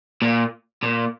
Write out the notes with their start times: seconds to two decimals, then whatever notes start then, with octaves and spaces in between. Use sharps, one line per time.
0.22 A#2
0.83 A#2